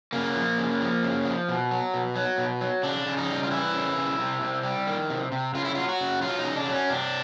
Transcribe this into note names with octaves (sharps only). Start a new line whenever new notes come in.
C#3 A#3
F3
C#3
F3
C#3
F3
B2
F#3
B2
F#3
B2
F#3
C#3 D4
C#3
D#4
G3
F4
E3 E4
C#3
C#3
C3
C3
G3
D#3
C3
C3
C#3 F4
E4
F#3 F4
F#4
C#3
F#3 F4
D#4
C#3
D4
F#3
C#4
C3 D4